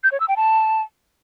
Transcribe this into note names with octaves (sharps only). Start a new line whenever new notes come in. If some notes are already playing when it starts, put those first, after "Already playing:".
G6
C#5
E6
G5
A5